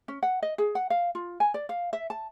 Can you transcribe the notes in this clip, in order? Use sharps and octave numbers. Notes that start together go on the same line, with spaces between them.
C#4
F#5
D#5
G#4
F#5
F5
F4
G#5
D5
F5
E5
A5